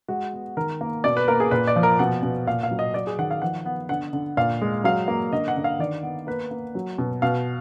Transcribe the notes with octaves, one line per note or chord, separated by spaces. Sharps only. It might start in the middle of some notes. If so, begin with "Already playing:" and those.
G#3 F#4
B3
D#3 A#4
A#3
B2 D5
B4
A#3 A#4
G#4
A#2 B4
D5
F3
A#4
B2 F#5
B2
A#2 F5
F5
F#3
D#5
F#3 D5
G#4
D#3 F#5
F5
F3 F#5
B3
D3 F#5
D3
A#2 F5
G#3
F#3 F5
A#3
D3 D#5
F#5
D3
F5
D#3 D5
B3
A#3 B4
A#3
F#3
B2
B2 F5